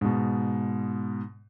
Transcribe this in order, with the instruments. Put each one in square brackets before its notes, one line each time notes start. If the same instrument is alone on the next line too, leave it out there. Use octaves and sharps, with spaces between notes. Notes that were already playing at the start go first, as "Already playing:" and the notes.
[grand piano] G#2 B2